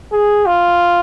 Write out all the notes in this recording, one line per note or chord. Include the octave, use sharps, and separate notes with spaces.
G#4
F4